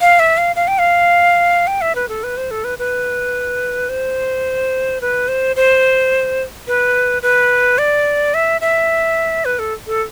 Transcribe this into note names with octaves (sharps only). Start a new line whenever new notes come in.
F5
E5
F5
F5
G5
F5
G5
E5
B4
A4
B4
C5
A4
B4
B4
C5
B4
C5
C5
B4
B4
D5
E5
E5
B4
A4
A4